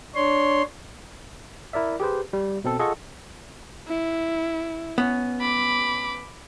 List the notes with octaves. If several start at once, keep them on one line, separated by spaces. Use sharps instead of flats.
D4 C#5 C6
E4 A#4 D5 E5
G4 G#4 B4 C5
G3
B2 C4 A4
F4 G#4 A4 D#5 F#5 C#6
E4
B3 C#4
B5 D6